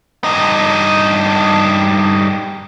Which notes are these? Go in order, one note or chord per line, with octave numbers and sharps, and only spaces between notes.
G2 D#4